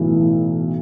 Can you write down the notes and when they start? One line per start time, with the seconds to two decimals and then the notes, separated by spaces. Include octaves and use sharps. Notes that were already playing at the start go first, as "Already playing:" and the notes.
Already playing: B1 A2 E3